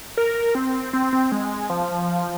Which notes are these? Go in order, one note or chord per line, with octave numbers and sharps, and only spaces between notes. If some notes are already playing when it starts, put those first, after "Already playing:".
A#4
C4
C4
C4
G#3
F3